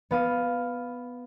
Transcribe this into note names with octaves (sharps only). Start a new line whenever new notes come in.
B3 F5 D#7